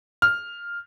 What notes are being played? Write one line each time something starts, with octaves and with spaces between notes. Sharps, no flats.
F6